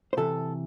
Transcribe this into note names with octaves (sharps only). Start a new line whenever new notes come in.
C5
C3 E3 A4